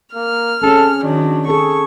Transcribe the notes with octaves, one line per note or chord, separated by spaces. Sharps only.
A#3 F6
C4 C#4 G#4 A4
D#3 F#3 D4
C4 G#4 A4 C#6